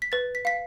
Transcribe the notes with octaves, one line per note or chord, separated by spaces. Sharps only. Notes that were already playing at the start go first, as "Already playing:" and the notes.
B6
B4 A6
B6
F5 B6